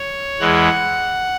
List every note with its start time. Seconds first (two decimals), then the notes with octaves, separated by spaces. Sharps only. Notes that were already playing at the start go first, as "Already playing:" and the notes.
Already playing: C#5
0.40 E2 E3 G#3 F#5